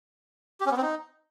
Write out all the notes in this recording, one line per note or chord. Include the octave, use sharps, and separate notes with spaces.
G4
C#4
B3
C4
D#4